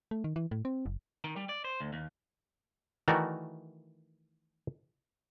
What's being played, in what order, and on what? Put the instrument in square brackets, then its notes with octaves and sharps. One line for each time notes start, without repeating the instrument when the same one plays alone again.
[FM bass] A3
D#3
E3
A2
C4
F#1
[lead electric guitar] D#3
G3
D5
C5
D2
D#2
[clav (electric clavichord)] D#3 E3 A3 F#4 A#4 D5